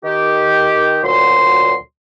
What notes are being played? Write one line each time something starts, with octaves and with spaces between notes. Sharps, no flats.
D#3 G4
D2 A#2 F#3 C6